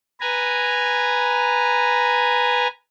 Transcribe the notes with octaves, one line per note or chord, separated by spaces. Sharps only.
B4 G#5 A#5